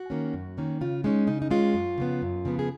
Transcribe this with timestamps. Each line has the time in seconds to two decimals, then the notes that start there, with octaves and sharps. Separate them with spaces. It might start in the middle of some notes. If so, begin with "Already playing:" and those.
Already playing: F#4
0.10 D#3 A#3 C#4
0.34 F#2
0.58 D#3 A#3 C#4
0.81 C#3 F4
1.04 G#3 C#4 D#4
1.27 C#3 D#4
1.42 D#4
1.51 G#3 C#4 F4
1.74 F#2
1.98 C#3 F3 B3
2.22 F#2
2.45 C#3 F3 B3
2.59 G#4